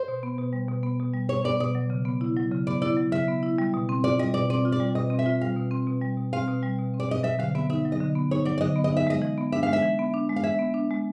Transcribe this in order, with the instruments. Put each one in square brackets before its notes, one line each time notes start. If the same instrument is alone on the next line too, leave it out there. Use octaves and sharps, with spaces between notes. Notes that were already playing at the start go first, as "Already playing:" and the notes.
Already playing: [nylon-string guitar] C5
[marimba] B2
B3
B2
G3
B2
B3
B2
G3
[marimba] B2 [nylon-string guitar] C#5
[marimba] B3 [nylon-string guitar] D5
[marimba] B2 [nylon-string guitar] D5
[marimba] F#3
C#3
B3
E4
F#3
C#3
[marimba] B3 [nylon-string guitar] D5
[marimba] E4 [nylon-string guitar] D5
[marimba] F#3
[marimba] C#3 [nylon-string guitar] E5
[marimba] B3
E4
G3
B2
C4
[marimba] F4 [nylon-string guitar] D5
[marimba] G3 [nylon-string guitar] D#5
[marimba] B2 [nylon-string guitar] D5
[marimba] C4 [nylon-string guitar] D5
[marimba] F4
[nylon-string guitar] D5
[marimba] G3
[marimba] B2 [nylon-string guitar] D#5
[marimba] C4
[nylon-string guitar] E5
[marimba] F4
[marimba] G3 [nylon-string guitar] F5
[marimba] B2
C4
B2
G3
B2
[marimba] C4 [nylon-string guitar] F5
[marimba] B2
G3
B2
C4
[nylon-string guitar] D5
[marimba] B2 [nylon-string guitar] D#5
[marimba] F#3 [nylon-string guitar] E5
[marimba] D3 [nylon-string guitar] F5
[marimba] B3 [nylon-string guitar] E5
[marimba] D#4 [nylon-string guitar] E5
[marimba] F#3
[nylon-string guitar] D#5
[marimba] D3
B3
[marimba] D#4 [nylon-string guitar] C#5
[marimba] F#3 [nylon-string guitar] D5
[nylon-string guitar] D5
[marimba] D3 [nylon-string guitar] D#5
[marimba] B3
[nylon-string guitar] D#5
[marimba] D#4 [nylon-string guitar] E5
[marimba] G#3 [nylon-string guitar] D#5
[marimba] E3
B3
[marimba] D4 [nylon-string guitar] E5
[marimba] G#3 [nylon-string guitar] F5
[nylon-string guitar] E5
[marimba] E3
B3
D4
G#3
[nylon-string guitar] F5
[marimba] E3 [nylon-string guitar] E5
[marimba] B3
D4
G#3